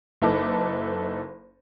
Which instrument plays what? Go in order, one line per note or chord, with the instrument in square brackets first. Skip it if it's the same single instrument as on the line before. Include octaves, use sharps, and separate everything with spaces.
[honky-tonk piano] F#1 D#4 E4 A4 B4 D6